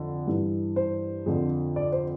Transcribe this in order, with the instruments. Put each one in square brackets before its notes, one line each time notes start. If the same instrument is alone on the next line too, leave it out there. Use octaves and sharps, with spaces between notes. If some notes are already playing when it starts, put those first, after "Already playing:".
Already playing: [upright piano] F2 D3 F3
G2 E3
C5
F2 D3 F3
D5
C5